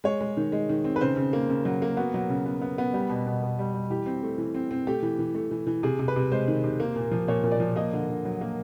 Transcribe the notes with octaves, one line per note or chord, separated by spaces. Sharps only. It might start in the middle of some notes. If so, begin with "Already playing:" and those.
G#3 C#5
G#3
D#3
G#3
D#3
C4
B4
C#3 C5
C#3
A#3
C#3
F#3
A#3
B3 F#4
F#3
C#3
B3
B3
B3
G3 G4
B2
B2
B2
G3
G3
E3 G4
C4
A3
E3
C4
C4
A3 G4
E3
E3
A3
E3
E3
C3 G#4
C3
B4
C3
G#3 C5
D#3
C3
A#3
A#2
F3
A#2 C#5
A#2
D5
F3
A#3 D#5
D3
D3
F#3
A#3